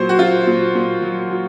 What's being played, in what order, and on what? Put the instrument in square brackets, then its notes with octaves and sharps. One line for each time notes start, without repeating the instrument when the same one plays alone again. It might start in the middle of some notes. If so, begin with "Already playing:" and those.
Already playing: [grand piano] A#2 F#3 C5
F#4
F#3 F4
A#2
A#2
F#3
F#3